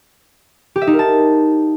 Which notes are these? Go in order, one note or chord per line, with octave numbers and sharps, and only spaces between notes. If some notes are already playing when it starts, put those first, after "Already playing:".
G4
E5
D#4
A#4
A5